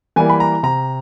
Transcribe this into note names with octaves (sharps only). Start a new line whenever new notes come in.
E3 G3 A#3 G#5
B5
A#5
C3 A#5